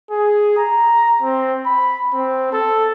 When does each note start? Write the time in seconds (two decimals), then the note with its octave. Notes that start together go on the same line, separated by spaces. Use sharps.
0.11 G#4
0.57 A#5
1.22 C4
1.66 B5
2.13 C4
2.53 A4